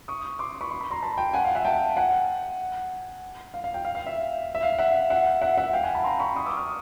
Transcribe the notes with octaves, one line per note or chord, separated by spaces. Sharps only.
C#6 D#6
C6 D6
B5 C#6
C6
B5
A#5 C6
A5 B5
G5 A5
F#5 G#5
F5
E5 F#5
G5 A5
F#5 G#5
F5
F5
F5 G5
F5
F5
E5
E5
F5
E5 F#5
E5 F#5
E5 F#5
E5 F#5
F5 G5
F#5 G#5
A5 B5
A#5 C6
B5 C#6
C#6 D#6
D6 E6
D#6 F6